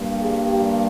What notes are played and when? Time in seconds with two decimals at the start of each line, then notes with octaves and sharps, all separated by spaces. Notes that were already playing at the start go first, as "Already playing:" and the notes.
Already playing: G2 G3 A#3
0.20 G#4
0.49 G4